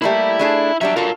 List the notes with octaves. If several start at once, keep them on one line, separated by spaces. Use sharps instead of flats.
G3 A3 A#3 E4 E5
A3 D4 G#4
E2 F#3 G3 D4 E5
F4 F#4 A4 A#4